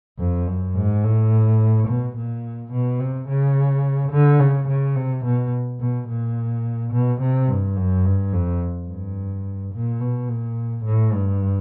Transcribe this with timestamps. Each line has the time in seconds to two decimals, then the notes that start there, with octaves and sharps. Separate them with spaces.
0.19 F2
0.47 F#2
0.75 G#2
1.04 A2
1.88 B2
2.16 A#2
2.72 B2
2.99 C3
3.28 C#3
4.11 D3
4.39 C#3
4.68 C#3
4.95 C3
5.25 B2
5.80 B2
6.09 A#2
6.92 B2
7.21 C3
7.48 G2
7.76 F#2
8.05 G2
8.33 F2
8.88 G2
9.73 A#2
10.00 B2
10.29 A#2
10.84 A2
11.13 G2